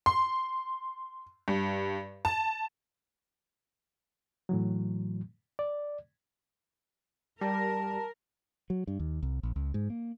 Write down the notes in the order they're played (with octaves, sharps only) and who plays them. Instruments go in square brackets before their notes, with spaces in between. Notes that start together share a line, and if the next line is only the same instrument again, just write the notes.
[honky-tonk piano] C6
G2
A5
[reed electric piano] A2 E3 F#3
D5
[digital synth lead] G3 [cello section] A#4 [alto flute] A5
[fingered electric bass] F#3
G2
D#2
C2
A#1
C#2
G#2
A#3